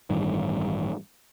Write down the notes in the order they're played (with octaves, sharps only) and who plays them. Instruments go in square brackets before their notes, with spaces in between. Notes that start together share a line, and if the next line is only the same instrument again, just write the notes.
[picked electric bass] A1 G2 D#3